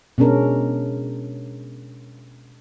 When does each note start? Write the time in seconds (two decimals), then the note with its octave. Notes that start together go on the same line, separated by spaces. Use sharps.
0.18 B2 G#3 C#4 D4 A#4